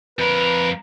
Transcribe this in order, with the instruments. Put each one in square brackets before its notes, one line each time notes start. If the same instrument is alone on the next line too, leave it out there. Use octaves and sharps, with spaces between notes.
[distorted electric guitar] F2 A#4 [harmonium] B4